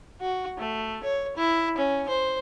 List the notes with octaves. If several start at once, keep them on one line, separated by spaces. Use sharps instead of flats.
F#4
A3
C#5
E4
C#4
C5